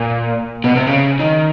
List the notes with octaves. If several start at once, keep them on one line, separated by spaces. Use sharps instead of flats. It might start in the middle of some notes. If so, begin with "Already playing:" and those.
Already playing: A#2
B2
C3
C#3
D#3